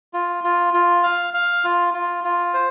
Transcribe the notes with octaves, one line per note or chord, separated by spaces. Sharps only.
F4
F4
F4
F5
F5
F4
F4
F4
C5